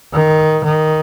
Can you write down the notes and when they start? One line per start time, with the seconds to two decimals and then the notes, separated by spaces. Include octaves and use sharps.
0.13 D#3
0.64 D#3